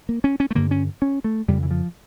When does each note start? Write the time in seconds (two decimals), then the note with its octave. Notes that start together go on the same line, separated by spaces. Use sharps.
0.09 A#3
0.24 C#4
0.40 C#4
0.51 A3
0.55 G2 D3 A#3
0.71 C#4
1.02 C#4
1.24 A3
1.48 F2 C#3 G3
1.63 E3
1.71 F3